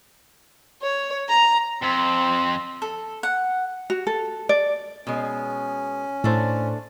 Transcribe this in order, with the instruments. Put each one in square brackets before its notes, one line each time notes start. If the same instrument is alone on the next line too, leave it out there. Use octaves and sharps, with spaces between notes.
[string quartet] C#5
A#5
[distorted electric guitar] F2 [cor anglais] C4
[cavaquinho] A4
F#5
[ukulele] F#4
A4
D5
[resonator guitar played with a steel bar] B2 G#3 [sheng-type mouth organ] C#4
[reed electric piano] A2 C5 [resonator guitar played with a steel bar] A3 D4